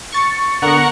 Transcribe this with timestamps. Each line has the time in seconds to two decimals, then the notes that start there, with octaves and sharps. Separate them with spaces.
0.12 C#6 A6 C#7
0.62 D3 B3 A#4 F#5 C#6